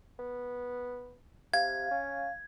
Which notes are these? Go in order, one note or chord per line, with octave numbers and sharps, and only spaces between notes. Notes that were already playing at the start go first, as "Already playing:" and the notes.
B3
C3 F5 G#6
C#4